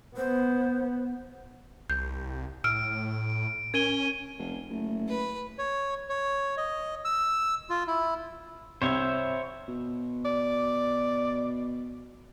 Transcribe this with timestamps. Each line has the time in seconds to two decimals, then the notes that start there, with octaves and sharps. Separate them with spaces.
0.17 B3 C5
1.90 C2 G6
2.64 A2 E6 F6 D7
3.74 C#4 A#4 G#6 D#7 G7
4.38 F1
4.69 F#1 A3
5.08 B4
5.58 C#5
6.09 C#5
6.57 D#5
7.05 E6
7.70 F4
7.87 E4
8.82 C2 C5 C#5 E5
9.68 B2
10.25 D5